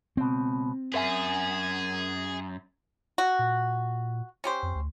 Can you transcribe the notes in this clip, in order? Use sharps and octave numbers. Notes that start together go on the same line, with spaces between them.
C#2 B2 C4
F#2 G#4 A#4 E5 G#5
F#4
A#2
C#4 G4 C5
F2
D2